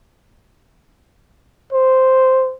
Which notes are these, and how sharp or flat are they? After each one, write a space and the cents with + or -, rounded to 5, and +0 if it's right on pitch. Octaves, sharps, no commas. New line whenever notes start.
C5 -5